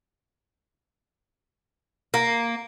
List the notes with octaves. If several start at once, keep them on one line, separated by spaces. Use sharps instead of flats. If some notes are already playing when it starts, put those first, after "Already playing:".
A#3